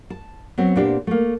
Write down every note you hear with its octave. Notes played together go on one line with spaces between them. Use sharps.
A5
F#3 B3 C4
A#2 B3 C4 D4 G4
A3 A#3